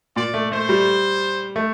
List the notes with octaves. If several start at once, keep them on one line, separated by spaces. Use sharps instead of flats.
A#2 D5
A3
A3 C5
G3
A3